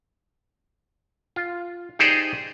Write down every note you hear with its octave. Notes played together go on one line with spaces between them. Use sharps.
F4
D#4 G4 G#4 C5 D5